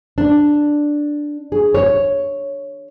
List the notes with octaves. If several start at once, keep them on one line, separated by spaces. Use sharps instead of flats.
D4
G#4
C#5